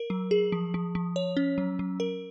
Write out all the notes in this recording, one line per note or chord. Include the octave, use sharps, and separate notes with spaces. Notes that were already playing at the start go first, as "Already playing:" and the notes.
Already playing: A#4
F#3
G#4
F3
F3
F3
C#5
C#4
F#3
F#3
A#4